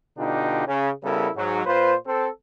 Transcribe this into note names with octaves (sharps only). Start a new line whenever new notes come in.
B2 D3 D4 D#4 F4 G4
C#3
C#3 G3 B3 E4 A4 A#4
G#2 F#3
A#2 F4 B4 C5
C4 A4